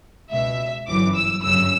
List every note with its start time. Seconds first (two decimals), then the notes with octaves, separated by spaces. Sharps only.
0.31 C#2 B2 E5
0.87 G1 F#2 E3 D6
1.16 E6
1.43 G1 F#2 C#3 E6